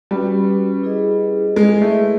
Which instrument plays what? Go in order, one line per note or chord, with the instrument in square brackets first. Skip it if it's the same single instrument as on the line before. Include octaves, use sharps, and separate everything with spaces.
[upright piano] G3 [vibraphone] C#4 F#4 B4
[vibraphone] E4 G#4 B4 D#5
[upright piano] G#3 [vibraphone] E4 G#4 B4 D#5
[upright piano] A3